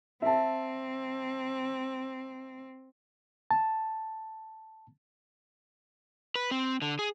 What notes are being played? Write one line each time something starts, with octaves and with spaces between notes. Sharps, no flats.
C4 E5 A5
A5
B4
C4
D3
G#4